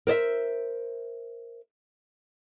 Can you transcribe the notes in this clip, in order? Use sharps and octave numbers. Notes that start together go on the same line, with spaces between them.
A#4 C5 D5 E5